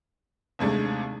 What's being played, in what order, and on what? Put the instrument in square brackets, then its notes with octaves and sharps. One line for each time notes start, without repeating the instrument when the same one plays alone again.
[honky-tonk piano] D#2 C3 G#3 A3 D4